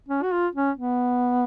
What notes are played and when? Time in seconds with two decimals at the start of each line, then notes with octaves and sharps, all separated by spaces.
0.09 C#4
0.23 F#4
0.32 F4
0.55 C#4
0.78 B3